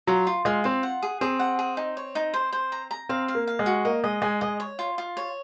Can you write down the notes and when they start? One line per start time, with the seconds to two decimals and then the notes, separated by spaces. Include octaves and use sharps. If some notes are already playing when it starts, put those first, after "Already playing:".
0.07 F#3 F4
0.27 F4
0.45 G#3 F4
0.64 C4 F4
0.83 F#5
1.02 G#4
1.21 C4 G#4
1.40 F#5
1.59 G#4
1.77 D#4
1.97 C#5
2.15 D#4
2.34 C5
2.52 C5
2.72 A#5
2.91 A#5
3.09 C4 F5
3.28 F5
3.35 A#3
3.47 F5
3.59 G#3
3.66 F#4
3.85 A#3 D#5
4.04 G#3 D#5
4.22 G#3 G#5
4.41 G#3 D#5
4.60 C#5
4.79 F4
4.98 F4
5.17 C#5